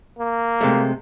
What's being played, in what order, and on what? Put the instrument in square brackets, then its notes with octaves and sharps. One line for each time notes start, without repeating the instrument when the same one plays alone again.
[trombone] A#3
[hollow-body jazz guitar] C3 G#3 A3